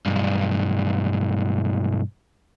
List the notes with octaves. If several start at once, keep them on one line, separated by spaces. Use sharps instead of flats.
B1 G2